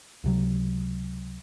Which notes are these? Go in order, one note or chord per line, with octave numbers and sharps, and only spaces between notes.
C#2 C3 F#3